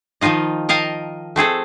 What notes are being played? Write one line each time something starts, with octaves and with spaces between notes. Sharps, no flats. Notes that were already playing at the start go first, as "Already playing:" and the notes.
D#3 F3 D#4 F4 D#5
A#4 D#5 F5 G5 A5
A3 C4 G#4 A4